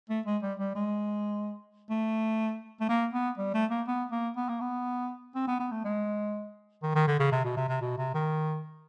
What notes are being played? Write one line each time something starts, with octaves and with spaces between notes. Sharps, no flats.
A3
G#3
G3
G3
G#3
A3
A3
A#3
B3
G3
A3
A#3
B3
A#3
B3
A#3
B3
C4
B3
B3
A3
G#3
D#3
D#3
D3
C#3
C3
B2
C3
C3
B2
C3
D#3